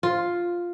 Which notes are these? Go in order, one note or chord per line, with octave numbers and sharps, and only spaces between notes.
F4